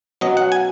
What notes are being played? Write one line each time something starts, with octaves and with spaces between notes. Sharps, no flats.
B2 F#3 C#4 D#5
F#5
G#5